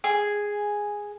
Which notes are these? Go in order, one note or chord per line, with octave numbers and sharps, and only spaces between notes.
G#4